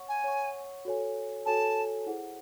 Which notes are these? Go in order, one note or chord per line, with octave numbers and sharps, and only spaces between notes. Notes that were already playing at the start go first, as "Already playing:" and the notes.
Already playing: C#5 F#5 C#6
G#5
C#5 F#5 C#6
F#4 A4 C#5 G#5
F#4 A4 C#5 G#5 A5
E4 G#4 C5 F#5